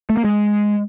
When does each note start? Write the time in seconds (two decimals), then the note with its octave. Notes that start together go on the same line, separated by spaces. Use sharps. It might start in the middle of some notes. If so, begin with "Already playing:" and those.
0.10 A3
0.17 A#3
0.24 G#3